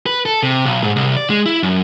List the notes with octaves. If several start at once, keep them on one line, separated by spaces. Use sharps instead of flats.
B4
A4
C3
B1
G#2
C2
D5
G#3
E4
F#2